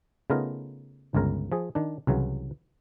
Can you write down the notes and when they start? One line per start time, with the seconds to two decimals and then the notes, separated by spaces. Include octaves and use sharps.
0.30 C#3 A3 B3 D#4 F4 A#4
1.14 G1 C#2 C#3 A#4
1.52 F3 G#4
1.75 D#3 D4
2.07 C2 C#3 E3 F#3